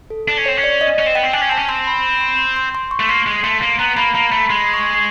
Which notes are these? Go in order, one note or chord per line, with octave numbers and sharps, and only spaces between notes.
A4
D4
C#4
C4 C#5
C#4
D5
D#5
C#4
C4
B3 G5
C4
D4 G#5
C#4
C4 A5
C#4
C4 C6
B5
B5
C6
C6
C6
C6
C#6
A3
A#3 C6
G#3
A3 C6
A#3
B3 A#5
A#3 B5
A#3 A#5
A3 B5
G#3 C6
C#6